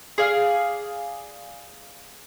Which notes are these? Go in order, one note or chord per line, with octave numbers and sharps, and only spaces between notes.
G#4 D5 F5